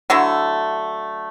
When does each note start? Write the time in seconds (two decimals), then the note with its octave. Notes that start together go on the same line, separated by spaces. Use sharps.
0.10 D3 F#3 A3 E4